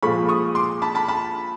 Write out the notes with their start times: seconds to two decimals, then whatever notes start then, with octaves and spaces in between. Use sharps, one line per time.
0.02 A#2 F3 G#3 B5 C#6
0.29 C#6 D#6
0.55 C6 D6
0.82 A5 B5
0.95 A5 B5
1.08 A5 B5